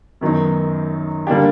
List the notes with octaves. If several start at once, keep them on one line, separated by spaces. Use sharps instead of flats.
F#2 D#3 F#3 B3 D#4
D3 G3 A#3 D4 G4